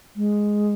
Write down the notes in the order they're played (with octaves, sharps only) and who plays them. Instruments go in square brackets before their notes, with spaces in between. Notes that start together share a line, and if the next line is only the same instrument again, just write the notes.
[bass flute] G#3